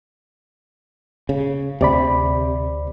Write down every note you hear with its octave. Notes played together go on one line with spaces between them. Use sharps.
C#3
D2 C3 D5 B5